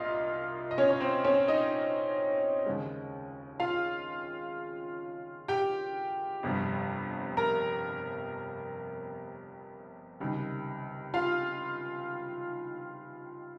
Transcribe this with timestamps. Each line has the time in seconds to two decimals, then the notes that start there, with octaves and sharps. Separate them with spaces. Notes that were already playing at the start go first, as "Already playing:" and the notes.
Already playing: C2 A#2 F4 D#5 F5
0.71 D#5
0.78 C#4 C#5
0.90 C#5
1.01 C4 C5
1.24 C#4 C#5
1.48 D#4 D#5
2.66 D#2 C#3 G#3
3.60 F4 F5
5.48 G4 G5
6.43 G1 F2 C3 G3
7.37 A#4 A#5
10.20 C#2 C3 D#3 G3
11.14 F4 F5